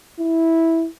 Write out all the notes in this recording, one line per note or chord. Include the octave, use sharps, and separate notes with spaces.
E4